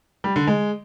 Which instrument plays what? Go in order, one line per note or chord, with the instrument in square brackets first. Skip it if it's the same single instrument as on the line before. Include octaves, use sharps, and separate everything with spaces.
[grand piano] G3
D3
G#3